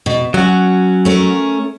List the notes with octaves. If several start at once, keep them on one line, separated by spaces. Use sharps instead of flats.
B2
F#3 C#4 F#4
A3 C#4 A#4